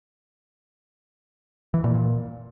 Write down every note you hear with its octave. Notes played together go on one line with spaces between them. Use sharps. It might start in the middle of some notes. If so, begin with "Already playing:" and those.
E3
A#2
A#2